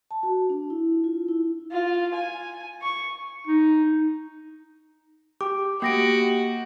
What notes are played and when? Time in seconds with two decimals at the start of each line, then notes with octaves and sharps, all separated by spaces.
0.11 A5
0.23 F#4
0.50 D4
0.70 E4
1.04 F4
1.28 E4
1.72 F4
2.14 G#5
2.82 C#6
3.47 D#4
5.41 G4 D6
5.82 A#3 F#4 G4 A#6 D7